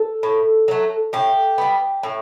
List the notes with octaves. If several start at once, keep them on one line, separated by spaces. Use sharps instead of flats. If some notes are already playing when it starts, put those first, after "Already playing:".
Already playing: A4
A2
F#3 A3
A2 G4
G3 B3
A2